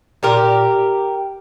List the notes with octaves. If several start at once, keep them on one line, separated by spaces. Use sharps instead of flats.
A#2 G4 A#4